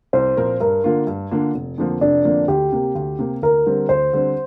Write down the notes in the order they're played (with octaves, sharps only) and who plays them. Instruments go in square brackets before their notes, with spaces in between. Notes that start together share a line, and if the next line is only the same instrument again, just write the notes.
[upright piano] C2 [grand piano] C5
[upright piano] A#2 F3 C4 A#4
[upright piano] G2 [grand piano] A#4
[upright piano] D3 A#3 D4 F4
G2
D3 A#3 D4 F4
F1
F2 D3 F3 A#3
[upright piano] F1 [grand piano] D4
[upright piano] F2 D3 F3 A#3
[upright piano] D2 [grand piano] G4
[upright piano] C3 A#3
D2
C3 A#3
[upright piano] D2 [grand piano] A#4
[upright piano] D3 G3 C4
[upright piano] D2 [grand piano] C5
[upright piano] D3 G3 C4